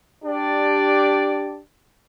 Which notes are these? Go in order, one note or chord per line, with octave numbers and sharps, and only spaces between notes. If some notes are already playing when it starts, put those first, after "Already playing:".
D4 G4 D5